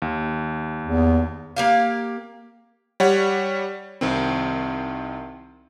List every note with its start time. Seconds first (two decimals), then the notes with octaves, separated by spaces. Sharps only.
0.02 D#2
0.83 E2
1.56 A#3 G4 F5
3.00 G3 C#5 F#5
4.01 C2 D#3 C4